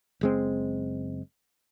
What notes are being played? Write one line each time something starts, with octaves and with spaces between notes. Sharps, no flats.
F#1 G#3 C4